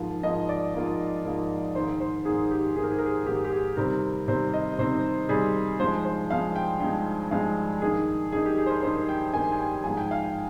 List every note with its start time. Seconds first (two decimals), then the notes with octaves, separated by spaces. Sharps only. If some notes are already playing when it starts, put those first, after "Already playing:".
Already playing: G#2 F3 A#3 F4
0.23 G#2 F3 A#3 F4 D#5
0.49 D5
0.74 G#2 F3 A#3 F4
1.24 G#2 F3 A#3 F4
1.75 G#2 D#3 A#3 C5
2.00 C5
2.25 G#2 D#3 A#3 G#4
2.51 G4
2.76 G#2 D#3 A#3 G#4
2.83 A#4
2.91 G#4
2.99 A#4
3.05 G#4
3.26 G#2 D#3 A#3 G4
3.44 G4
3.52 G#4
3.77 C3 D#3 G3 C4 A#4
4.28 C3 D#3 G3 C4 C5
4.53 D#5
4.79 C3 D#3 G3 C4 C5
5.29 C3 D#3 G3 C4 G#4
5.80 G2 F3 G#3 D#4 C5
6.05 C5
6.30 G2 F3 G#3 D#4 F5
6.55 G5
6.80 G2 F3 G#3 D#4 G5
7.31 G2 F3 G#3 D#4 F5
7.82 G2 D#3 A#3 D#4 G#4
8.32 G2 D#3 A#3 D#4 G#4
8.45 G4
8.58 G#4
8.66 C5
8.70 A#4
8.83 G2 D#3 A#3 D#4 C5
9.09 G5
9.33 G2 D#3 A#3 D#4 G#5
9.52 G#5
9.59 G5
9.84 G#2 F3 G#3 G#5
9.97 G5
10.11 F5
10.24 G5